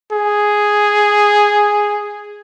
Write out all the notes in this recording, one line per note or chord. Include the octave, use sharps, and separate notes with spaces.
G#4